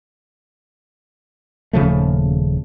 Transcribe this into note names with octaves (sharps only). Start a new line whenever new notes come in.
D#1 C#3 F3 A3